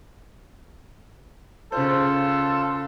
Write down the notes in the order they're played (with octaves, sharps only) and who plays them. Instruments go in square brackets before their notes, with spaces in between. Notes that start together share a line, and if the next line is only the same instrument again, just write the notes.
[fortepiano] C#3 C5 [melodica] F4 [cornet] A4